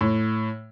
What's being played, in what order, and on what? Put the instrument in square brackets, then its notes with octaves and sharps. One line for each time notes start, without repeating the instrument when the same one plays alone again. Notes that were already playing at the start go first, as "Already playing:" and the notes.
[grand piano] A2